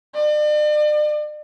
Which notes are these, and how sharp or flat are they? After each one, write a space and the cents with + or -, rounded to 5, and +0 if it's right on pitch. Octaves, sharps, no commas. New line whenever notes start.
D5 +40